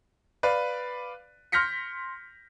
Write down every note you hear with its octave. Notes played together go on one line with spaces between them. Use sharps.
B4 D5 F5
C6 F6 G6 A#6 B6 C#7